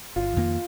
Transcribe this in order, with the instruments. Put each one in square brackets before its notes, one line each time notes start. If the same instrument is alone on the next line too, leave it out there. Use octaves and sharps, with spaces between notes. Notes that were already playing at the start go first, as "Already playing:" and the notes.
[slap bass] G1 [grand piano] F4
[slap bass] F2 D#3 A#3